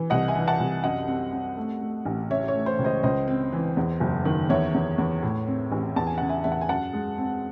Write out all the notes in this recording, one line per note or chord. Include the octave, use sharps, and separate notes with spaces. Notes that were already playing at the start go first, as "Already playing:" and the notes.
Already playing: E3
C2 D#5 F#5
E5 G#5
E3
F#5 A5
C2
F#2 D#5 F#5
C4
C4
A3
A3
A1
C#3 C#5 E5
C#5
A3
C5
C#2
C5 D#5
C#2 C5 D#5
C4
E3
E2
F#1
D#3
E2 C#5 E5
E2
E2
A2
C4
A1
E2 A5
G#5
C#3 F#5
E5 G#5
E2 E5
F#5
G#5
F#2 F#5 A5
G#3
C4